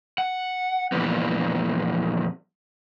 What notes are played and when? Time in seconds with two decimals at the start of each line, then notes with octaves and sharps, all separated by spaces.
0.18 F#5
0.92 F2 A#2 E3 G3 B3